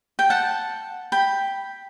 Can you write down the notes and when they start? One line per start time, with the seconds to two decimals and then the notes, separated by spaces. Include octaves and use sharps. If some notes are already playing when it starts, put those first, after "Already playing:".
0.19 G5
0.30 F#5 A5
1.12 G5 B5